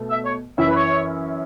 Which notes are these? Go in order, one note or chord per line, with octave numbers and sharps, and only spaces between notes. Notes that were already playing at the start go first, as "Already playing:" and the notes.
Already playing: B2 A3
E5
C#5
F#2 E3 C#4 E4 E5
B4
C#5